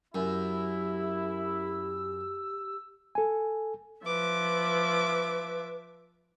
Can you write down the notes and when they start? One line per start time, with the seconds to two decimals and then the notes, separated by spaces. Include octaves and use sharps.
0.15 F#2 E4 G4 E6
3.15 A4 G#5
4.06 F3 B4 E5 D6